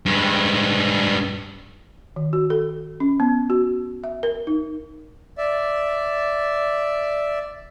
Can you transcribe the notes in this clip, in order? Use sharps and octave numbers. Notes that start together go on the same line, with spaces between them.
G2 G#3
D#3
F#4
A4
C#4
B3
F#4
E5
A#4
D#4
D5 E5